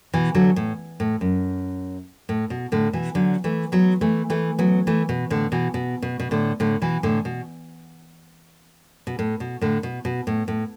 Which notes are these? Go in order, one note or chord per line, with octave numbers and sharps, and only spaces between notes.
B2 E3
D3 F#3
A2
A2
F#2
A2
B2
A2 D3
B2 E3
D3 F#3
E3 A3
F#3 B3
E3 A3
E3 A3
F#3 B3
E3 A3
B2
A2 D3
B2 E3
B2
B2
B2
A2 D3
A2 D3
B2 E3
A2 D3
B2
B2
A2
B2
A2 D3
B2
B2
A2
A2